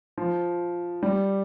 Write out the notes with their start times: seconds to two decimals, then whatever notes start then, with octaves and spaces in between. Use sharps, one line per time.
0.18 F3
1.03 G3